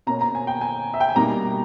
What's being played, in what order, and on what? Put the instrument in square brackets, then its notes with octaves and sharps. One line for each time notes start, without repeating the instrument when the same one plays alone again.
[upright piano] B2 A#3 C#4 A#5
A#5
G#5
G5
G#5
E5
G5
G#5
B2 G3 A#3 D#4 A#5